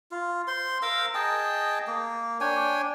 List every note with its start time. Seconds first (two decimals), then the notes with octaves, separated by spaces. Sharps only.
0.11 F4
0.47 C5 C6
0.82 A#4 F5 A#5 E6
1.15 G#4 D#5 G5 A5
1.87 A#3
2.41 D4 C#5 G5 G#5